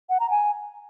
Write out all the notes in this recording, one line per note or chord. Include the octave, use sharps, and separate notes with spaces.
F#5
A#5
G#5